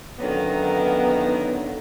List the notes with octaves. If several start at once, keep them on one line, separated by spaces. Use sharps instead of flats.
F#2 D3 D#3 F#3 A#3 B3